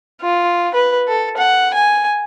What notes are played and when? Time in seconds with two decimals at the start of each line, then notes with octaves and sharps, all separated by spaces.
0.21 F4
0.74 B4
1.08 A4
1.37 F#5
1.74 G#5